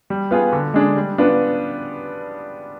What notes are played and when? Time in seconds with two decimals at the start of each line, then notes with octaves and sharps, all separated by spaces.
0.10 G3
0.31 B3 F4 G#4
0.52 D3
0.74 G#3 D4 G#4
0.96 G3
1.18 B3 D4 F4